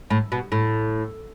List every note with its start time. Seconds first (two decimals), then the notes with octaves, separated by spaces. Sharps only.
0.10 A2
0.32 B2
0.52 A2